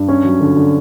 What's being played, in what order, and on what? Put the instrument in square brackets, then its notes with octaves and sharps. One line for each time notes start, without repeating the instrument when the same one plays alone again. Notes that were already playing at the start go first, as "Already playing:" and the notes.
Already playing: [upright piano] G2
C#4
F#3
D3
D3